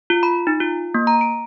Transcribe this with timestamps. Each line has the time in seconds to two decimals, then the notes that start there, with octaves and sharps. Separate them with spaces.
0.10 F4
0.23 B5
0.47 D#4
0.60 F4
0.94 A#3
1.07 A#5
1.21 D7